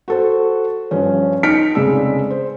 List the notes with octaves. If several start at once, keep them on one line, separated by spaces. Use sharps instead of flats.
F#4 A4 C5
G2 F3 C#4
D#4 F6 B6 C#7 D7
F1 C#3 G#3 D5 E6
C5